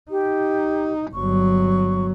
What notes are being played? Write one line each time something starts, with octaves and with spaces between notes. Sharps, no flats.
D#4 G4
G1 F#3 C#6